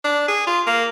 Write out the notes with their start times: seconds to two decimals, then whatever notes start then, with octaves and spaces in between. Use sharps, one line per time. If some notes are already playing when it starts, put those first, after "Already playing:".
0.04 D4
0.28 G#4
0.47 F4
0.67 A#3